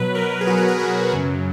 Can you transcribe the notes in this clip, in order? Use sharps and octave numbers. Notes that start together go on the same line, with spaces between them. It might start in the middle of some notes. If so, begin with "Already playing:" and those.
Already playing: B2 F#3 B4
B2 F#3 A#4
G#4
B2 F#3 F#4
G#4
A#4
B2 F#3 G#4
F#2 C#3 F#3